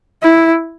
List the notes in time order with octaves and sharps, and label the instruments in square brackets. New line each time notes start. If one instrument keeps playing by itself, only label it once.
[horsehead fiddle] E4